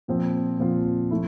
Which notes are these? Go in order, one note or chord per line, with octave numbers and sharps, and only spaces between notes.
A#2 F3 C4 F4
A#2 F3 C4 F4
F3 A3 E4